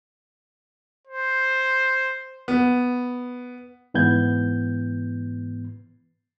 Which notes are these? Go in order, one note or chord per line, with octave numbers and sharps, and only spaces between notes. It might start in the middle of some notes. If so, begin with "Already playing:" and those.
C5
B3
G#2 E3 B3 G6 G#6